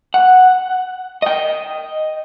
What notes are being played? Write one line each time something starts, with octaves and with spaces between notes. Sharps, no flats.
F#5
D#5 G5